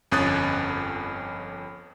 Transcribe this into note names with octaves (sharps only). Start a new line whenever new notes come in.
G1 F2 C#4 D#6 F#6 A6